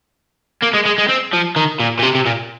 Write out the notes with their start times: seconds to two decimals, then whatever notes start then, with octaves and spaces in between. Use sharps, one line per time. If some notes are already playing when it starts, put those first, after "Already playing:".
0.63 A#3
0.74 G#3
0.86 G#3
0.99 G#3
1.09 C4
1.33 F3
1.56 D#3
1.79 A#2
1.99 A#2
2.02 C3
2.15 C3
2.26 A#2